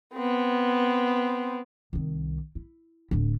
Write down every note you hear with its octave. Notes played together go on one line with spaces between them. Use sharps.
B3 C4
C2 D#3
E4
D1 D3